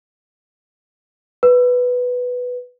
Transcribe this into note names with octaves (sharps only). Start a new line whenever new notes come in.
B4